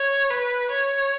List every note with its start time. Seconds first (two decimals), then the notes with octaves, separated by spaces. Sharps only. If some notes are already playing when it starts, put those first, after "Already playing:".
Already playing: C#5
0.30 B4
0.71 C#5